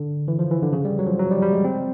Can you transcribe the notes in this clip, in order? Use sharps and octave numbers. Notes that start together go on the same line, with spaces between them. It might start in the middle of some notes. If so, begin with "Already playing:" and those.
Already playing: D3
E3
F3
E3
D3
C#3
G3
F#3
F3
F#3
G3
G3
G#3
C4